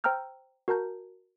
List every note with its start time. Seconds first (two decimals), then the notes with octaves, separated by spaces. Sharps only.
0.04 C5 G5 A#5 E6 F6 G6
0.68 F#4 A#4 A5 A#5 G6